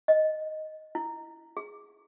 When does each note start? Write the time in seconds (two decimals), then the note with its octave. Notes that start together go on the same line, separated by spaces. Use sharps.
0.08 D#5
0.95 E4
1.57 G#4